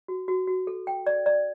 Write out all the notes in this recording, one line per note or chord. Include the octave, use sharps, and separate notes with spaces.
F#4
F#4
F#4
A4
G5
D5
D5